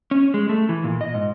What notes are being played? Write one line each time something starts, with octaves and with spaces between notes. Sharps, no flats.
C#4
G#3
A3
E3
A#2
D#5
G#2